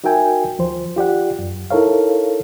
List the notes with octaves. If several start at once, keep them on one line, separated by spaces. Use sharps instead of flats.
D#4 F#4 A#4 E5 G5 G#5
D2 F3 C5
F4 G4 D5 F#5
F#2
D#4 E4 A4 A#4 C#5 F5